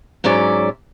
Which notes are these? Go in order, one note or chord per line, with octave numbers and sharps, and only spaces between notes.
G#2 F#3 C#4 D5 E5